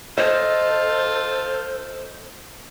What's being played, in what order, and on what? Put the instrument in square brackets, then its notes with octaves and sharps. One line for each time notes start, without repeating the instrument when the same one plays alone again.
[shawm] F4 [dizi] A4 [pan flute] C5 [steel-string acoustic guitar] D#5